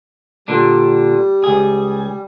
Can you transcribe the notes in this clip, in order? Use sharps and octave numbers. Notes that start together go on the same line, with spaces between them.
A#2 D3 G3 D4
C#2 G#4